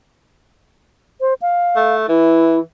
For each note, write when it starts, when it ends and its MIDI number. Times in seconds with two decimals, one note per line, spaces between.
1.21 1.34 72
1.42 1.95 77
1.76 2.04 57
2.08 2.60 52
2.08 2.59 64